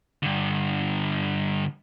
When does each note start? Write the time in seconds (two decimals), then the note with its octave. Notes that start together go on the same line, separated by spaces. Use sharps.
0.23 G2 D3